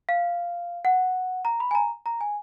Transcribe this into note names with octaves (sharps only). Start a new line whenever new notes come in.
F5
F#5
A#5
B5
G#5
A#5
A#5
G#5